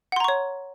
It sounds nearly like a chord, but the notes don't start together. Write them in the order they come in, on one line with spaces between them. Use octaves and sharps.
F#5 C6 A#5 C#6 C#5